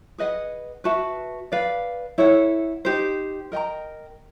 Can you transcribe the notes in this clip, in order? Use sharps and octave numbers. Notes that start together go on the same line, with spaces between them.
G#4 B4 D#5 F#5
F#4 B4 E5 A5
B4 D5 F5
E4 A4 C#5 F#5
D#4 G4 C5
A#4 D#5 G5 A#5